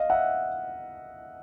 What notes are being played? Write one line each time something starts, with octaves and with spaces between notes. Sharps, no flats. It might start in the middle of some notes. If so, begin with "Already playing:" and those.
Already playing: D#5 F5
E5 F#5